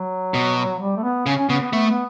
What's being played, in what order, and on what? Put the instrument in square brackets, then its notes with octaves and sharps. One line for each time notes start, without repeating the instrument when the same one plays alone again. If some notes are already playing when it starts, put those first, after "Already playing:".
Already playing: [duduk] F#3
[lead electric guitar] B2
[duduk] G3
A3
B3
[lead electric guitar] C#3 [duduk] C#4
[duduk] C#4
[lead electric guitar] C#3 [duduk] B3
[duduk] B3
[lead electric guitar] A3 [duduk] B3
[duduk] B3